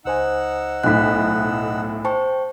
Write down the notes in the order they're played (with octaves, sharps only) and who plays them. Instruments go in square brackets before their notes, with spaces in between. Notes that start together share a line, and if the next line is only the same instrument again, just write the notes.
[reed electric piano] C#2 C5 G#5 [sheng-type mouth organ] D#4 F#5 E6
[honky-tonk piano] B1 A2 [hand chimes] F#6 B6
[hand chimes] C5 G5 C#6 [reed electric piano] A5